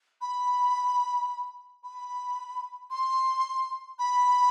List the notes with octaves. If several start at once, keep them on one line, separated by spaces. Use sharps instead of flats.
B5
B5
C6
B5